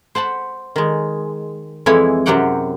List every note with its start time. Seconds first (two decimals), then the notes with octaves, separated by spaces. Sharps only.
0.15 C5 F#5 A5 B5
0.76 D#3 G#3
1.86 F2 E3 G#3 E4 C#5 G#5
2.26 F#2 C3 F#3 G4 F#5 G5